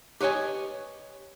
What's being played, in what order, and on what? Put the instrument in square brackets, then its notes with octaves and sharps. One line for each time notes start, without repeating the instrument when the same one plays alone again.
[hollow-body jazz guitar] G4 B4 C#5 D#5 G#5